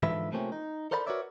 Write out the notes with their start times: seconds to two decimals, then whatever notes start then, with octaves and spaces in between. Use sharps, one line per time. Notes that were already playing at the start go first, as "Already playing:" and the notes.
0.03 G#2 D3 E3 F3 B4 E5
0.32 C3 F3 A3 A#3 C4 C#4
0.52 D#4
0.91 A4 A#4 C5 D5 G5 B5
1.06 F#4 A#4 B4 C#5 D5 E5